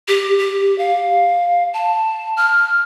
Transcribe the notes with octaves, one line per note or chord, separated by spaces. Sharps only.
G4
G4
F5
A5
F6